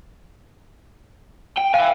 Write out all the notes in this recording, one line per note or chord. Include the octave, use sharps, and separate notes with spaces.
G5
E5 F5 G#5